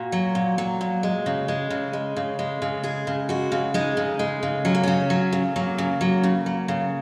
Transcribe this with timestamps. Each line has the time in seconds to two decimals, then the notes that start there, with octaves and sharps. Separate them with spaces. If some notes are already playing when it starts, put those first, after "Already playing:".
Already playing: A#2 F#4
0.12 F#3
0.35 A#2
0.58 F#3
0.81 A#2
1.03 G#3
1.26 C#3
1.48 G#3
1.70 C#3
1.93 G#3
2.16 C#3
2.39 G#3
2.62 C#3
2.83 G#3 G#4
3.07 C#3
3.29 G#3 F#4
3.52 C#3
3.74 G#3 D#4
3.97 C#3
4.19 G#3
4.43 C#3
4.65 F#3 C#4
4.75 A#3
4.83 C#3 C#4
5.10 F#3
5.33 C#3
5.56 F#3 A#3
5.78 C#3
6.01 F#3
6.23 C#3
6.46 F#3
6.68 C#3